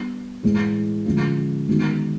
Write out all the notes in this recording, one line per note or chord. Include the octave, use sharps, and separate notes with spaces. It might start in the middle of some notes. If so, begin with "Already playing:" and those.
Already playing: G3 B3 D4
A2 E3 G#3
D3 F3 G#3 C#4 F4
D#3 G#3 B3 D#4 F#4